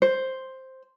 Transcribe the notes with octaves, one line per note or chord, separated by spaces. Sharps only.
C5